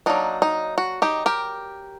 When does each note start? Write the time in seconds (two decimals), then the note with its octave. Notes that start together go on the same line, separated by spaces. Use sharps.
0.06 F#3 A#3 D4 D#4
0.42 D#4
0.78 F#4
1.02 D#4 G4
1.26 G4 A#4